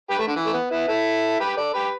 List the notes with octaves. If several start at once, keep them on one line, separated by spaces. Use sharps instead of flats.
G4 B4
A3
D3
E3
A3
B3
B3 E4
E4 A4
G4 B4
A4 D5
G4 B4